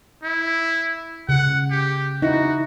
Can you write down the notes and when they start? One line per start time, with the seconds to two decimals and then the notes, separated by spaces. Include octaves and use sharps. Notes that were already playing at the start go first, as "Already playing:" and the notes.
0.23 E4
1.29 C#3 F#5
1.71 G4
2.22 D#4 E4 F#4